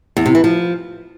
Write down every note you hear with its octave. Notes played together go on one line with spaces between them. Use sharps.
E2
C3
E3
F3